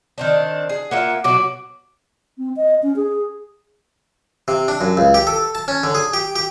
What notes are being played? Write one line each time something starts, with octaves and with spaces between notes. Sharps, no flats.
D#3 C4 D4
G#4
A#3 F4 E5 F#5
B2 F#3 F#4 D6
C4
D#5
C#4
G#4
C3
D4
F#2
C#2
G4
A4
A5
C#4
D3
G#4
G4
G4